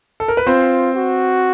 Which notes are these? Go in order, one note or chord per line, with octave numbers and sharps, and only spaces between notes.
A4
A#4
B4
C4 F4 C5
F#4